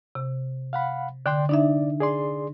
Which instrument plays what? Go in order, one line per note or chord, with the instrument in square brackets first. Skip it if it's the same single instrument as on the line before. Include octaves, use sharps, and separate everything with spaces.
[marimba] C3
[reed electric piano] F5 F#5 B5
[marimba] D3 [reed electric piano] D5 G5 C6
[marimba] D4 D#4 E5 [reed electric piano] D5
[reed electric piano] G#4 D5 C6